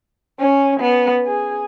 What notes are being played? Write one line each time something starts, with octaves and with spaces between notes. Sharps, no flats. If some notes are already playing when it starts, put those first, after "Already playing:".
C#4
B3
G#4